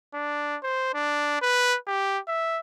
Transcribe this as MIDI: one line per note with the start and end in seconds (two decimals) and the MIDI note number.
0.14 0.56 62
0.63 0.90 72
0.94 1.41 62
1.42 1.77 71
1.87 2.19 67
2.27 2.60 76